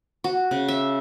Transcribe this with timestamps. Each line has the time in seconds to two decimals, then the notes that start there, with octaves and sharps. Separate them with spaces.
0.24 F#4
0.51 C#3
0.69 E5